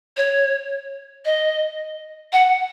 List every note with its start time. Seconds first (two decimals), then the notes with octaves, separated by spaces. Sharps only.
0.17 C#5
1.25 D#5
2.33 F#5